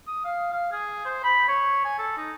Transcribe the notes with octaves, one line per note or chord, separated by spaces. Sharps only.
D#6
F5
F5
G#4
C5
B5
C#5
G#5
A4
D#4